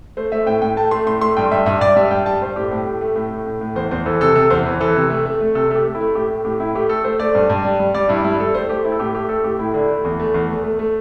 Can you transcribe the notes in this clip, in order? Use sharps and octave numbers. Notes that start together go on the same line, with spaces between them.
A3 C5
A3 E5
A2 G5
A2 G5
A3 A5
A3 C6
A2 C6
A3 C6
G2 G5
G2 E5
G2 E5
G2 D5
G3 E5
G2 G5
G3 A5
G2 C5
A2 G4
A2
A2
A3
A2
A2
A2
A2
E2 C5
E2 C5
E3 A4
C3 A4
C3 A4
E2 C5
E3
E3 A4
C3
A3
A3
A3
C3 A4
A3 G4 A4
A3
E4
A3
A2 G4
A3
A2 G4
A2 E4
A3 G4
A3 A4
A3 C5
A3 D5
G2
G2
G3
G3
G3 D5
G2 E4
G3 E4
G3 A4
A3 C5
A3 G4
A3 E4
A4
A2 G4
A3 G4
A3 A4
A2 G4
A2 E4
D3 E4
A3
E2
A3
E2
A3
A3
A3